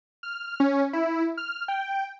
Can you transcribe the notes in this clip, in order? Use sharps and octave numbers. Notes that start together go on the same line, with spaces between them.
F6
C#4
E4
F6
G5